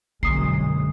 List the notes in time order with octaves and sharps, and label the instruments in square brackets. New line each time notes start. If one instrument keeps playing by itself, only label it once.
[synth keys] A#1 [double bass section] F#2 B2 G#3 [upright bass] D3 [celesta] D#6 C7